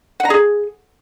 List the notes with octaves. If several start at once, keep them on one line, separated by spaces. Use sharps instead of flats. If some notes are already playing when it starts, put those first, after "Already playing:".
F#5
A#5
G#4